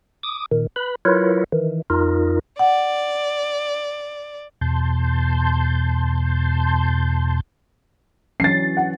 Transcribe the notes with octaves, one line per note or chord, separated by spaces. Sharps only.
D6 D#6
A#2 D#3
B4 B5
F#3 E4 F4 A#4 B4 C#5
D#3 E3
F2 D#4 F4 A#4
D5 F#5
E2 B2 A5 C6 G6
E3 F#3 C#4 A6 C7
F#5